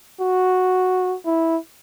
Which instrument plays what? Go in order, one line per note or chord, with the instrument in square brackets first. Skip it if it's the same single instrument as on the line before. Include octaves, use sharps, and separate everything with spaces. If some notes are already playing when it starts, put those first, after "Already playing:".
[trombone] F#4
E4